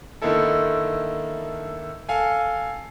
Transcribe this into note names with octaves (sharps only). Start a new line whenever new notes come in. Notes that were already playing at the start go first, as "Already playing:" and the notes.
D3 D#3 A#3 D#4 E4 A4
A4 F5 G#5